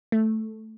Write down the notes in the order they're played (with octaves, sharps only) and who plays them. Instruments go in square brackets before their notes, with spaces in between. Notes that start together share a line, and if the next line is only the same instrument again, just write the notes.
[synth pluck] A3